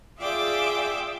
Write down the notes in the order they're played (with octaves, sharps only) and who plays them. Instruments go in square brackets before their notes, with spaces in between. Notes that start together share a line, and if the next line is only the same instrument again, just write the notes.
[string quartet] F4 G#4 D5 E5 G5 D6